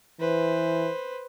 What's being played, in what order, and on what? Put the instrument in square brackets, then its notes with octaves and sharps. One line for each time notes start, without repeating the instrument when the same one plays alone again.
[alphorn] E3 [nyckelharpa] B4 C5